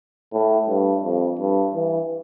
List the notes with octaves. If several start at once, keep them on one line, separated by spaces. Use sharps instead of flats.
A2
G2
F2
G2
E3